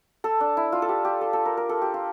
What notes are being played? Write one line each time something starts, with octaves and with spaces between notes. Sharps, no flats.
A4
D4
E4
F4
A4
G4
G4
A4
A4
A#4
A#4
A4
G4
F4